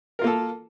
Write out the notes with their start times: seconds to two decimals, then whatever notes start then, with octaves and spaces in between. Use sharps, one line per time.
0.19 A#4
0.22 F4
0.24 A#3
0.27 A4